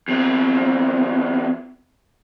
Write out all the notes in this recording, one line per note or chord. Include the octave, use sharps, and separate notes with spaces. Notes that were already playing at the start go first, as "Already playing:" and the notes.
E2 C4